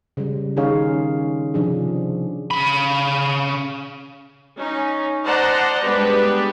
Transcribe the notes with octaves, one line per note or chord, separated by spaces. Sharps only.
C#3 G3
D#3 C#4 D#4 G#4 C#5 F5
C3 F3 D4 G#4
C#3 B5
C#4 D#4
C5 D5 D#5 F#5 A5 A#5
G3 G#3 B3 D4 G4 B4